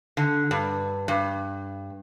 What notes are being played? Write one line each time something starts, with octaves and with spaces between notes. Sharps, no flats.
D3
G2
G2